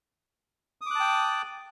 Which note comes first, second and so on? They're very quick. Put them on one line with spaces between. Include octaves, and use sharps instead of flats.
D#6 D6 F#6 A5 G5